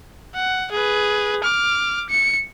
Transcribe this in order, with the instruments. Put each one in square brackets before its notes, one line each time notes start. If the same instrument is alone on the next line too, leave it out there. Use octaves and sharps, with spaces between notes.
[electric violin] F#5
G#4 B4
D6 F6
C#7